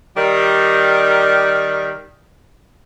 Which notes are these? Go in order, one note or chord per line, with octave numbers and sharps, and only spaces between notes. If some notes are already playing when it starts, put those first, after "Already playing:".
D#3 G3